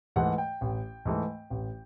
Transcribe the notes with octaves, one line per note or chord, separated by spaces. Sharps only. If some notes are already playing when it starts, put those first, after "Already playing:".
G#2 E3 A3 F#5
G5
A1
G#2 E3 A3
A1